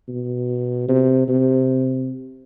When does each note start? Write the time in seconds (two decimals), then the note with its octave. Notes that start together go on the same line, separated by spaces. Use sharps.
0.08 B2
0.89 C3
1.28 C3